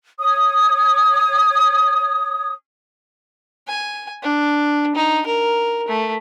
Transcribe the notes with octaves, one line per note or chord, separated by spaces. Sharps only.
C#5 D#6
G#5
D4
D#4
A#4
A3